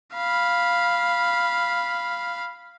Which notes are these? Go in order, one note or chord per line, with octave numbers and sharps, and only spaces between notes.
F5 B5